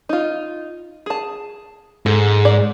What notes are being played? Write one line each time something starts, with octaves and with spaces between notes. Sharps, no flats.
D#4 F4
G#4 A5
G#2 A4
D5